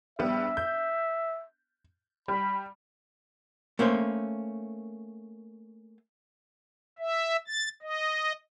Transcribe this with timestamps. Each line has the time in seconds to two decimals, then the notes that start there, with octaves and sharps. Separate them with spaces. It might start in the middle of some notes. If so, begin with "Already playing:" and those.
0.19 A#1 G3 B3 E5
0.57 G6
2.28 G3 B5
3.79 A3 A#3 C#4 C5
6.99 E5
7.47 A6
7.82 D#5